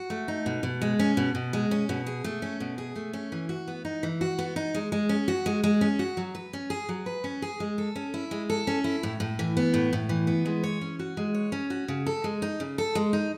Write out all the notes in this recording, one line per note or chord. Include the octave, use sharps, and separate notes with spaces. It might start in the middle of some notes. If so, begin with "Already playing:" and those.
Already playing: F#4
A3
D#4
B2
B2
G#3
C#4
B2
B2
G#3
C#4
B2
G#4
A3
C#4
B2
G#4
A3
C#4
E3
F#4
B3
D#4
E3
F#4
B3
D#4
G#3
G#3
C#4
F#4
G#3
G#3
C#4
F#4
F#3
B4
C#4
G#4
F#3
B4
C#4
G#4
G#3
A4
C#4
E4
G#3
A4
C#4
E4
A2
A2
E3
B3
A2
A2
E3
B3
G#3
C#5
C#4
F#4
G#3
C#5
C#4
F#4
C#3
A4
G#3
D#4
C#3
A4
G#3
D#4